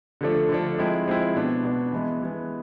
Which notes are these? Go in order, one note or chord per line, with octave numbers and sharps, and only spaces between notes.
D3 F3 A3 D4
D3 F3 A3 D4
F3 G#3 C4 E4
F3 G#3 C4 E4
B2 B3 D4
B2 B3 D4
E3 G#3 B3
E3 G#3 B3